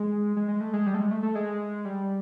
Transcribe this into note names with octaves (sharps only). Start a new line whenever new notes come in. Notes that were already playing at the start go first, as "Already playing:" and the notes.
Already playing: G#3
G#3
G#3
A3
G#3
G3
A3
G#3
A3
A3
G#3
G3